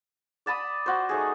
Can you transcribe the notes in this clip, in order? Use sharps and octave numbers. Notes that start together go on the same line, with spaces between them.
D5 A5 B5 D#6
F#4 C5
A3 D#4 G#4